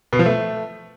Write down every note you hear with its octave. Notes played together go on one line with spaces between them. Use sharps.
B2
F3
A3